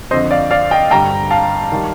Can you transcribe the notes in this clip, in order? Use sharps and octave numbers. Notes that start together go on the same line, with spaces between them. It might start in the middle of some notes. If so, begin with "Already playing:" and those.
F2 D3 F3 C5 D#5
D5 F5
D5 F5
D#5 G5
G2 D3 G3 G5 A#5
F5 A5
D#3 G3